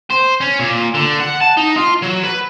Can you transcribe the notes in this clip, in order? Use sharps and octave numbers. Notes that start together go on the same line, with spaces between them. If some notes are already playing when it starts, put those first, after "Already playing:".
C5
C#4
A#2
D3
F#5
A5
D#4
F4
F#3
B4